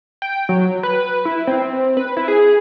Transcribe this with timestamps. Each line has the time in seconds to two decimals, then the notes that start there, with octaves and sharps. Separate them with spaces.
0.22 G5
0.49 F#3
0.83 B4
1.25 E4
1.47 C4
1.97 B4
2.17 E4
2.28 G#4